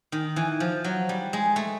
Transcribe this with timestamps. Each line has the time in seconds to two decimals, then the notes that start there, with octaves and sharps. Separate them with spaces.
0.12 D#3
0.36 E3
0.60 F3
0.84 F#3
1.09 G3
1.33 G#3
1.56 A3